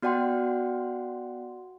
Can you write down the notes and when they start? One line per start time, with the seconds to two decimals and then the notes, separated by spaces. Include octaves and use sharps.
0.02 B3 F#4 D5 F#5 G5 C6